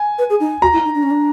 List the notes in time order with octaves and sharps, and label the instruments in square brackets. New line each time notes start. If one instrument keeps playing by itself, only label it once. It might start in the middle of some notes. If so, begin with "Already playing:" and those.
Already playing: [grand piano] G#5
[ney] B4
G#4
D#4
[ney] F#4 [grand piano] A#5
[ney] E4
D#4
D4
C#4
D4